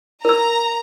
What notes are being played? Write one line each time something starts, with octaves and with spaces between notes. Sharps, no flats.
A#4 A#5 E6